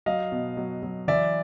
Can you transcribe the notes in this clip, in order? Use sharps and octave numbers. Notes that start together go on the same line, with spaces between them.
F#3 D#5 F5
B2
F#3
F#3
E3 D5 E5